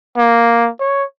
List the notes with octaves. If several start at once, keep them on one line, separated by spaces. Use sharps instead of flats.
A#3
C#5